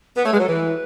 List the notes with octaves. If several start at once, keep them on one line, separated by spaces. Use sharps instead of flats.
B3
A3 C#5
G#3 B4
F#3 A4
E3 B4